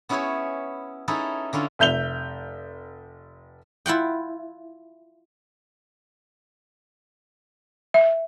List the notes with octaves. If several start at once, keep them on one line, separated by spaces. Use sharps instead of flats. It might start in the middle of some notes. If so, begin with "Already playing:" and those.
B3 C#4 E4 G#4 B4 C#5
C#4 D#4 E4 G#4 A4 B4
D3 C#4 E4 F4
F1 E5 G6 F7 G7
E4 F4 F#5 G5
E5